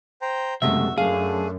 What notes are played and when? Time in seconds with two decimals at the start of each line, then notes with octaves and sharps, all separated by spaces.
0.22 C5 G5 A#5
0.62 F#1 C3 G#3 A3 F#4 E5
0.98 F#2 A3 D4 G#4 F5